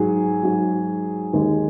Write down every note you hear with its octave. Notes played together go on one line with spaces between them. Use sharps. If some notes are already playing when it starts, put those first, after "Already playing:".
Already playing: G#2 F#3 G#4
G#2 F#3
D#2 D#3 G#3